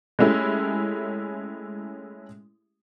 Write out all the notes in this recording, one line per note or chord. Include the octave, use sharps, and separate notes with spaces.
G#3 A3 C#4 E4 G4